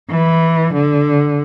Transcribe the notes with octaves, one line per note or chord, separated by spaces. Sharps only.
E3
D3